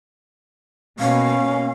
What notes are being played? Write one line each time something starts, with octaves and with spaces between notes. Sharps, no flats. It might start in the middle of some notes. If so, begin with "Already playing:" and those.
B2 A#3 C#4 F5